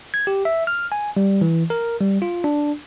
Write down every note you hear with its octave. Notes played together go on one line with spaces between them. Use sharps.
G#6
G4
E5
F6
G#5
G3
E3
A#4
G3
F4
D4